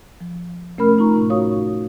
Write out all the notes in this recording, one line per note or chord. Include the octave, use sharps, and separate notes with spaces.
F3
C3 A3 C#4 A#4 B5 F6
D#4 F4 A#5 C#6
A2 C3 D#4
F#4 C#5 F5 C#6 D#6